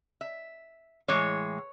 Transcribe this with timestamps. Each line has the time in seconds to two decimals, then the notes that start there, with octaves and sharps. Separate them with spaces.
0.21 E5
1.08 A2 E3 G#3 C#5